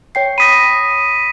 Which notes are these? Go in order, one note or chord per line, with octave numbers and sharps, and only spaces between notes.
C#5 G5 C7
B5 D#6 A#6 B6 D#7